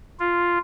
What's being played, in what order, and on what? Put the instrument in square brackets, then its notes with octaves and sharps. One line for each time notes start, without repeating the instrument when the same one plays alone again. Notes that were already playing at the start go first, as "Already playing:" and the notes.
[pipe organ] F4